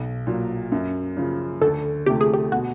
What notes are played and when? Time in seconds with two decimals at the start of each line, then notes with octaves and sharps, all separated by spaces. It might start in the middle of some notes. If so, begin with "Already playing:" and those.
Already playing: B1
0.27 A#2 F#3
0.72 F#2
1.17 C#3 F3
1.62 D2 A4
2.06 C3 F3 A3 G4
2.21 G#4
2.34 G4
2.51 B2 F#4